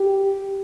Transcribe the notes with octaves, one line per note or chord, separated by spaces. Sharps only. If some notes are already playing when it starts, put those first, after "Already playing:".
Already playing: G4